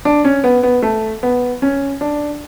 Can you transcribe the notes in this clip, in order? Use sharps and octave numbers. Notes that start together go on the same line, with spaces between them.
D4
C#4
B3
B3
A3
B3
C#4
D4